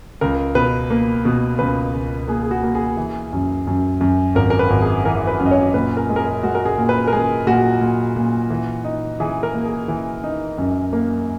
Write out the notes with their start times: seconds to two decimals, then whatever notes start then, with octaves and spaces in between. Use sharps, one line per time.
0.21 C#2 A#4
0.55 B2 B4
0.90 A#3
1.25 B2
1.59 C#2 B4
1.94 C#2
2.28 A#3 G#4
2.43 G#4
2.51 F#4
2.63 A#3
2.75 G#4
2.97 E3
3.33 F#2
3.67 F#2
4.01 F#2
4.35 G#1 A#4
4.50 A#4
4.59 B4
4.70 G#1
4.82 G#4
5.05 E3 A#4
5.27 B4
5.40 F#2
5.46 D#5
5.51 C#5
5.74 A#2 B4
5.97 A#4
6.09 G#3
6.16 A#4
6.20 G#4
6.43 G#3 F#4
6.55 A#4
6.65 G#4
6.78 A#2
6.89 B4
7.07 A#4
7.13 G#3 G#4
7.47 A#2 F#4
7.81 A#2
8.16 A#2
8.50 E3
8.84 D#4
9.20 E3 G#4
9.43 A#4
9.54 A#3
9.65 G#4
9.88 E3
10.24 D#4
10.58 F#2
10.93 A#3